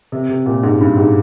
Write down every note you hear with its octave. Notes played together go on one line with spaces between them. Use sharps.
C3
C3
A#2
G#2
G2
G#2